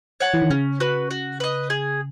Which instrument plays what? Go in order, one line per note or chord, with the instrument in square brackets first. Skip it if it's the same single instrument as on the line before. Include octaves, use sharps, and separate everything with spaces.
[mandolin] C#5 F#5 A5
[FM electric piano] E3
D#3
[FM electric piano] C#3 [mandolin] C#4
[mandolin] F#4 B4
F#4
B4 D#5
G#4